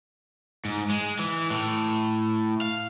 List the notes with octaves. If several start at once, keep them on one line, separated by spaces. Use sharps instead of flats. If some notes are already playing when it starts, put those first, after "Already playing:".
G#2
G#3
E3
A2
F5